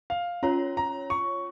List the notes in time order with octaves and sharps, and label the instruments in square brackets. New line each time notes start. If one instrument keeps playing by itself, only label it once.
[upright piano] F5
[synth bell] C#4 F4 C#5 [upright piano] A#5
[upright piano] A#5
C#6